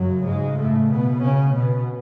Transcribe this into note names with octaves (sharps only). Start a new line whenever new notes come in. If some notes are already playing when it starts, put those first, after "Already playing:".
Already playing: F#2 C#3 F#3
G#2 G#3
A2 A3
B2 B3
C#3 C#4
B2 B3